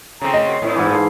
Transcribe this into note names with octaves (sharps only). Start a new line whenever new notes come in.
A2 C#3 C4 E4 A#5
D#5
F#4 A#4 C6
A2 C4 E4
G#2 E3
F4 A5 C6